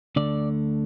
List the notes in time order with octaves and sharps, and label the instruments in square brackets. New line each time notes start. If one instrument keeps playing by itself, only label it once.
[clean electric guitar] D2 D3 A3 D5